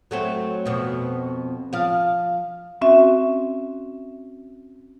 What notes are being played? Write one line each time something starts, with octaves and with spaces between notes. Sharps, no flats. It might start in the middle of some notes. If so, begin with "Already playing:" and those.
F#3 A3 C4
F2 B2
F3 F5
C4 C#4 F#4 E5